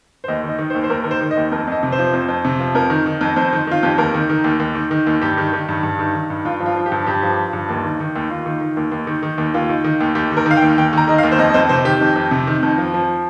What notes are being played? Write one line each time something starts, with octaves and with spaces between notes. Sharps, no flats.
C5
D#2 D#5
D#3 D#5
D#3
C5
D#2
C5
D#2 A#4
D#3 A#4
C5
D#3
D#5
D#2
F2 A#4
F2 D#5
C3
C5
F3
F2
F2
C3
F3
F2 A#4
D#3
D#3
F2
F2 C5
D#3
D#3 F4
F2 G4
D#2 A#4
D#3
D#3
D#2
D#2
D#3
D#3
D#2
G2 G4
D#3
D#3
G2
G2
D#3
D#3
G2
G2 F4
F3
F4
F3
G4
G2
G2 G4
F3
F3
G2
D#2
D#3
D#3
D#2
D#2 F4
D#3
D#3
D#2
D#2
D#3
D#3
D#2
D#2 F4
D#3
D#3
D#2
D#2 G4
D#3
A#4
D#3 F5
G5
D#2
D#2 G5
D#3 A#5
D#3 D#5
F5
D#2
C5
F2 D#5
D#5
F2 C5
C3 C5
D#3 G4
F2
F2
C3
D#3
F2
F3
F3